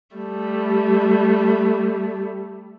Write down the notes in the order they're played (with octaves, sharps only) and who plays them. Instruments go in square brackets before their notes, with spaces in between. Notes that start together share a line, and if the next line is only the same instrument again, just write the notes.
[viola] G3 A3